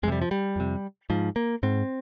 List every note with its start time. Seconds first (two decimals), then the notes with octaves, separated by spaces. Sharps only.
0.03 F2 G#3
0.08 C3 G3
0.22 F3
0.31 G3
0.56 F2 C3
1.10 G#2 F3
1.36 A#3
1.63 G#2 C4